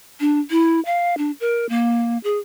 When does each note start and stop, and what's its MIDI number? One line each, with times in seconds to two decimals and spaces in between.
0.20 0.40 62
0.51 0.80 64
0.86 1.17 77
1.18 1.31 62
1.40 1.66 70
1.69 2.18 58
2.24 2.38 68